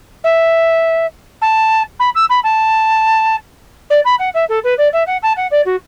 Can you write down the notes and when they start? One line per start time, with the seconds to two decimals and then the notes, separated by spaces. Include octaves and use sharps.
0.24 E5
1.41 A5
1.99 B5
2.15 E6
2.30 B5
2.43 A5
3.90 D5
4.05 B5
4.19 F#5
4.34 E5
4.49 A4
4.64 B4
4.78 D5
4.93 E5
5.07 F#5
5.23 A5
5.37 F#5
5.51 D5
5.65 F#4